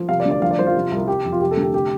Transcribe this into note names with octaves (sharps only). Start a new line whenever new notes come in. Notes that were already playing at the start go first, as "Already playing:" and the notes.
Already playing: F3
C3 F5
D5
D2
D5
F3 F5
D5
F3 C5
F4
C3
C2
C3 G4
F2
F4
C3 G4
A4
D2
G4
C3 G4